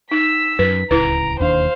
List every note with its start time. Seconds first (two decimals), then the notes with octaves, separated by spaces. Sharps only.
0.11 D#4 E6 B6
0.59 F#2 B4 B6
0.91 D1 C#2 E4 B4 A#5 D7
1.39 E1 D#2 D4 C5 F5